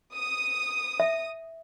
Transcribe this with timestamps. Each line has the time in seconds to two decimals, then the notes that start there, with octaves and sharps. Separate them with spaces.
0.14 D#6
1.00 E5